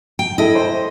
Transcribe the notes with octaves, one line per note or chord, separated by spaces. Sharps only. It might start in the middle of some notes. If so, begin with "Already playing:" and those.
G5
E4 A4 D#5
C5